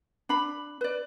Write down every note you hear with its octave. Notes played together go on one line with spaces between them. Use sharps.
D4 B5
B4 D5